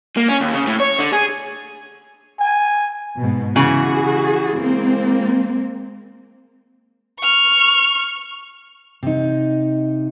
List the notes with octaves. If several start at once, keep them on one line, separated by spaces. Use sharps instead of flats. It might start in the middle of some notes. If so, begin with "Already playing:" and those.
A#3
C#4
D#2
C#3
A2
C#5
D3
G#4
G#5
G#2 B2
C#3 E3 F#4 G#4
G#3 A#3 C4
C#6 F6
C3 D#4